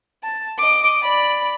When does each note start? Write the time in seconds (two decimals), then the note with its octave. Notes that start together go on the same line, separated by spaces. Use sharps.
0.24 A5
0.58 D#5 D6
1.03 D5 B5